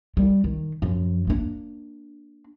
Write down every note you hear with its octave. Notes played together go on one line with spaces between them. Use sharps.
G3
D#3
F#2 F3
A#3 D4